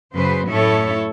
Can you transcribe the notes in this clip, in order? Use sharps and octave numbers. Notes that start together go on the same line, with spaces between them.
F#2 C#3 F#3 B4 C5
F#2 A2 E4 A4 C#5